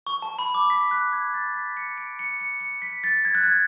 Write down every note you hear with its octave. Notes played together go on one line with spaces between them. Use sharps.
C#6
A5
B5
D6
B6
F#6
G#6
A6
B6
C#7
D7
C#7
C#7
C#7
B6
A6
G#6
F#6
G#6